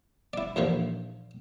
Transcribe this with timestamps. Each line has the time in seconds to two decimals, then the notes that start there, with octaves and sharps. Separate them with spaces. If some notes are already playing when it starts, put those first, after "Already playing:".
0.33 E4 D5
0.56 D#2 A#2 D3 E3 F3